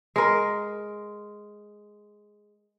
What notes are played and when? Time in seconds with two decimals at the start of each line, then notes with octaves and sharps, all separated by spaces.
0.16 G#3 A#4